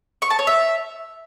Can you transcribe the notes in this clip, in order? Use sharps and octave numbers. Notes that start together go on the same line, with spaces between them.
C#6
A5
C#5
E5